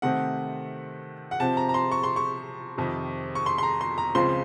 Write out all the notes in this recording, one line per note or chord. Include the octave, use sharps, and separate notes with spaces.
C3 D#3 A3 C4 F#5
F#5
C3 F3 C4 A5
A#5
A#5
C6
C#6
C6
C#6
F2 C3 D#3
C#6
C6
C6
A#5
C6
A#5
C#2 C#3 F3 C4 C6